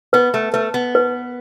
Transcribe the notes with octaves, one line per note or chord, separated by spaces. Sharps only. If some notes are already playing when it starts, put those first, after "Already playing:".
B3 B4
A3
A3 B4
B3
B4